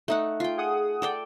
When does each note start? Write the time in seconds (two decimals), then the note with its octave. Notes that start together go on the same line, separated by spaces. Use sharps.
0.08 A3 D#4 F#5
0.40 F4 G5
0.58 G#4 F#5 D#6
1.02 A4 D5 G5